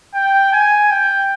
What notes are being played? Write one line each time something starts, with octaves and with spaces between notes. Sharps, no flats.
G5
G#5
G5